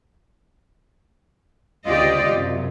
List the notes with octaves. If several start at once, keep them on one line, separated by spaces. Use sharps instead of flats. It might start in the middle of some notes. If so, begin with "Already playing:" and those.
D2 C#3 F4 G4 D5 D#5
F#2 C3